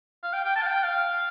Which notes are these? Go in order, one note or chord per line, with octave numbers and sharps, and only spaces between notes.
F5
G5
G5
A5
F5
G5
F5